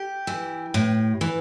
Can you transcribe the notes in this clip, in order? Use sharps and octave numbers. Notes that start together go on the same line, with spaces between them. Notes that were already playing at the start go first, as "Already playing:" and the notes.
Already playing: G4
E3
A2
E3